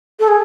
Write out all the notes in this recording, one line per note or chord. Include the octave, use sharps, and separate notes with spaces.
A4
G#4